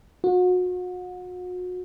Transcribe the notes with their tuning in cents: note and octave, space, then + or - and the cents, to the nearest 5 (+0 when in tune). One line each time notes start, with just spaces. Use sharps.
F#4 -35